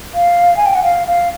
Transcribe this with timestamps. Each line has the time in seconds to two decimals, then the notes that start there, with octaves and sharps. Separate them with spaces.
0.15 F5
0.57 G#5
0.66 G5
0.75 F#5
0.83 F5
1.08 F5